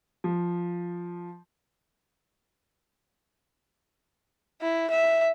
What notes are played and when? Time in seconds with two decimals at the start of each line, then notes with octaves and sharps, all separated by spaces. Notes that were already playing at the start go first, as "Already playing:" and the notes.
0.24 F3
4.61 E4
4.91 E5